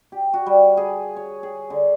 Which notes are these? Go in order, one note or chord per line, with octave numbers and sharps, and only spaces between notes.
G4
F#4
G3
G#4
C#5
G#4
D3